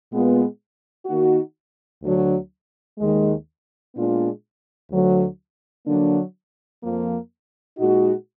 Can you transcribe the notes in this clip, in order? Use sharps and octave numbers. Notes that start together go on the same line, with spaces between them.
A#2 G#3 B3 F4
D#3 A#3 D#4 F#4
D2 D3 F#3 D4
D#2 D#3 G#3
A#2 G#3 B3 D4 F4
D2 D3 F#3
D3 F#3 A#3 D4
F2 F3 A#3
A#2 G#3 D#4 F#4